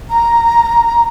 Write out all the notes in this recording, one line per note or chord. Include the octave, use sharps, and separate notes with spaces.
A#5